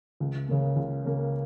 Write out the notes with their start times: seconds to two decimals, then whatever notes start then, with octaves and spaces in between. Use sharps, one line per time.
0.20 C#2
0.48 C#3 A#3
0.76 C#2
1.05 C#3 A#3